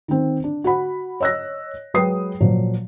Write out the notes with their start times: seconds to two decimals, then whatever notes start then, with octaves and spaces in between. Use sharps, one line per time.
0.08 D#3 C4
0.44 D4
0.64 F#4 F#5 B5
1.20 C#5 D#5 E6 F#6 A#6
1.94 F#3 G#3 B4 G5 D#6 C7
2.41 A#2 F3 F#3